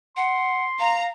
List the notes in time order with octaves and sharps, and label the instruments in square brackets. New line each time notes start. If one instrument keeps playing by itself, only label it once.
[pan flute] F#5 [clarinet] C6
[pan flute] F5 [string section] A#5